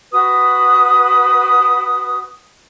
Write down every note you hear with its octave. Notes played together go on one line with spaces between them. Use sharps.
F#4 B4 D#6